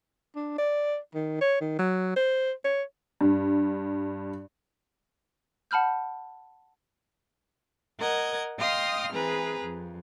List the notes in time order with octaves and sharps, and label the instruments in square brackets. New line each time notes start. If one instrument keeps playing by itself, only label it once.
[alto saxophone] D4
D5
D#3
C#5
D#3
F#3
C5
C#5
[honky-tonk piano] G2
[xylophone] F#5 A5 B5 F6 G6
[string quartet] A#4 D#5 F#5 G#6
D#5 F5 G5 C6 D#6 F6
E3 C4 G#4 B4 A#5
F2